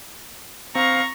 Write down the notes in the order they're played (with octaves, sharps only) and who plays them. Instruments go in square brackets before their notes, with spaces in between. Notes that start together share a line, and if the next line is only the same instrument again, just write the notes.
[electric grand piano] C4 [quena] F5 [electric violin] A#5 C#6